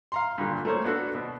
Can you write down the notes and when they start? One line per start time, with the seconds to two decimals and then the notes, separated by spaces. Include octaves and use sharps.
0.12 F5 A#5 C6
0.38 G2 A#2 D3
0.65 A3 A#3 C5 C#5
0.84 B3 D4 F#4 A4
1.15 B2